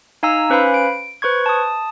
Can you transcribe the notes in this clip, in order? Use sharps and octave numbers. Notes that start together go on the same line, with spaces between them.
D#4 F5 G#5 A#5 E6
C#4 B4 C5 F5 G#5 B5
D7
B4 C5 C#6 G#6
A5 D#6